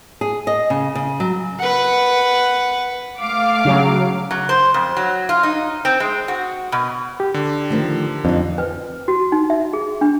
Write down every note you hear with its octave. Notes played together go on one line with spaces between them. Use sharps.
G#4
D#5
C#3
C#3
F#3
B4 F#5
A3 F5 D6
C#3 F#3
F#3
C5
F2
F#3
F4
D#4
C4
G#3
F#4
B2
G4
D3
D#3 F3 A3
F2 D4 D#4
B4
F#4
D#4
E5
G#4
D4